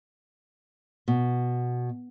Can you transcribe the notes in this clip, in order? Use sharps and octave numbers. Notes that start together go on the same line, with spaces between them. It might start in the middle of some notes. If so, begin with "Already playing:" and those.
B2